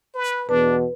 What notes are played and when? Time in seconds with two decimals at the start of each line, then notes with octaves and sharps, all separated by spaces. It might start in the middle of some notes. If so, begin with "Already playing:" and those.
0.15 B4
0.49 E2 B2 D4 B4